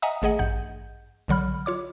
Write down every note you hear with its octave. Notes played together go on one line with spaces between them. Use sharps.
D#5 E5 F#5 G#5 A#5 D#6
G#1 A3 G#4 D#5 F#5
A1 G2 F#5 G6
B1 D3 F#3 B5 F6
F4 C#5 D6